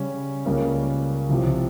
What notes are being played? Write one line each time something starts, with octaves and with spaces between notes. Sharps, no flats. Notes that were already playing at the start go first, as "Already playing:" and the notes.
Already playing: C#3 G3 C#4
C#2 C#3 G3 A#3 C#4
C2 C3 F3 C4 G4